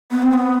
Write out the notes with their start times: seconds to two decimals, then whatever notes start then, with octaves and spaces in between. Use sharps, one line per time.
0.11 B3
0.23 C4
0.33 B3